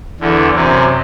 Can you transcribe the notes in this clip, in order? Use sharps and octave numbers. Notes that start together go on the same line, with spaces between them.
E2 D3
F#2 C3